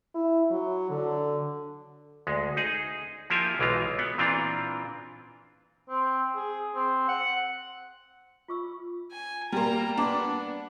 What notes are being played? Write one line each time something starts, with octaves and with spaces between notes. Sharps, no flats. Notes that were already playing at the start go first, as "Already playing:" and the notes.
E4
F#3
D3
D2 G#3
D#4 G#4
F3 A#3 E4 F4 G4 G#5
B1 E3 G#3 F4
B3
A#2 E3 C4 D4 F4
C4
G#4
C4
F#5
F4 C#6 E6
G#5
G3 A#3 A#5
B3 D4 F#5 C6 D6